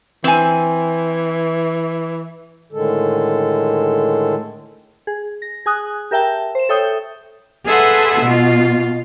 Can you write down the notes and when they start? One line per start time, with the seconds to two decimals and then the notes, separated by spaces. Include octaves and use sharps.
0.24 E3 C4 G#5
2.72 A2 D3 D#3 G#3 A4
5.07 G#4
5.42 A#6
5.66 G#4 G#5 D#6 F#6
6.11 G4 A#4 E5 G5 A5
6.55 C5 E7
6.69 A4 C#5 E5 G5 D#6 G6
7.65 G#4 A4 B4 E5 F#5 C6
8.20 B2 F4